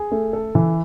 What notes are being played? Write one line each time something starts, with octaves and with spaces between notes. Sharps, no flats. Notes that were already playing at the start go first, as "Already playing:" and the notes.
Already playing: G#4
A3
A4
E3